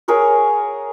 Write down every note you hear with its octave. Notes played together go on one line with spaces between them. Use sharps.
G#4 A#4 C#5 F#5